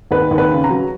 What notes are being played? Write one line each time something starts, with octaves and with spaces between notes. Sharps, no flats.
D#2 B4
D#2
B4
C#3
A#5
F#3